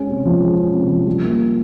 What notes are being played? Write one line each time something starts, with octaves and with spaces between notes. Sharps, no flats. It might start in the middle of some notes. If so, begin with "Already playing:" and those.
Already playing: G#3 C#4
C3
F3
G#3
C#4
C3
F3
G3
A#3